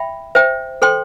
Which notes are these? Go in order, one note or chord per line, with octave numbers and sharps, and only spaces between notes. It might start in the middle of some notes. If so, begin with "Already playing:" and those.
Already playing: E5 G5 B5
C5 E5 G5
A4 C5 G5 C6